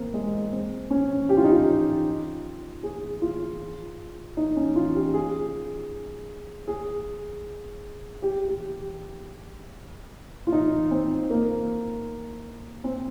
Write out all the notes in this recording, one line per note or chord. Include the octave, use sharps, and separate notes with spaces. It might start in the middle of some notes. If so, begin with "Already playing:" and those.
Already playing: A#3 C4
G#3
C4
C#4
G4
F4
D#4
F4
G#4
F4
D#4
C#4
F4
G4
G#4
G#4
G4
G4
F4
D#4
C4
A#3
C4